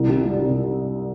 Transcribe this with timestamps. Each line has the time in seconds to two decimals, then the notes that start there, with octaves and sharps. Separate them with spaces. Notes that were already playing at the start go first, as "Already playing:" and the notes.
Already playing: C2
0.09 C3
0.25 G3
0.42 C3